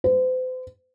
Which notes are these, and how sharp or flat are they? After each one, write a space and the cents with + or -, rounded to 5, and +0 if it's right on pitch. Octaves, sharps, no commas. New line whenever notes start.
C5 -40